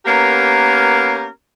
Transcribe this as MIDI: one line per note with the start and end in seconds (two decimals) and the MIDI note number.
0.06 1.27 58
0.06 1.27 59
0.06 1.27 61
0.06 1.27 67
0.06 1.27 70